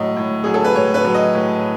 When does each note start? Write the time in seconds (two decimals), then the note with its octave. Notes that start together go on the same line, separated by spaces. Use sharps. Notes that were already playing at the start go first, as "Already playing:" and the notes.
Already playing: A2 F#3 D#5
0.17 A2
0.44 F#3 G#4
0.54 A4
0.64 B4
0.75 A2 C#5
0.94 B4
1.05 F#3
1.14 D#5
1.34 A2